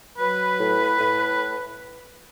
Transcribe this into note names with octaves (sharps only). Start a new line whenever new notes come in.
F#3 B4
A2
A2